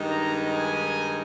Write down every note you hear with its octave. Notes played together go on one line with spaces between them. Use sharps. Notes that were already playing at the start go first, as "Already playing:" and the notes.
Already playing: G2 D#3 G#3 D#4
A#5
G#5